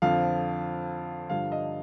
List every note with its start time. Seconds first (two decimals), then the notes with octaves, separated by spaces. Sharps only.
0.02 F2 D3 F3 F5
1.30 G2 D3 F3 F5
1.52 D#5